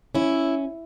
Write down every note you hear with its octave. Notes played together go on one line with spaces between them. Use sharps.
C#4 E4